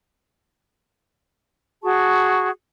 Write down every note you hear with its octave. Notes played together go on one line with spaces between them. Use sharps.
F#4 G#4 A5 C#6